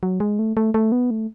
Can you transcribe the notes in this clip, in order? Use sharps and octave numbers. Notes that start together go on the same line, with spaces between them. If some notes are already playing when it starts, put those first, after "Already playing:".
F#3
G#3
A3
A3
A3
B3
A3